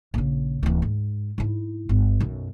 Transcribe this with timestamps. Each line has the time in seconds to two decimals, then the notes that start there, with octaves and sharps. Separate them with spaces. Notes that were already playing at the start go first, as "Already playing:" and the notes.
0.14 A#1 C#3
0.63 D1 E3
0.82 G#2
1.38 G#2 E4
1.89 G1
2.20 B1 F#2